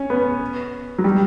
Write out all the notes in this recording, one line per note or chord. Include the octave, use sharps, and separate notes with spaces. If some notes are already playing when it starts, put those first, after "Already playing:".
Already playing: C#4
B3
F#3
G3